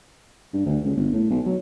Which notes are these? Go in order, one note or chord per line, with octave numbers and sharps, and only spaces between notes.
G2
D2
C#2
G1
A2
B1
F#3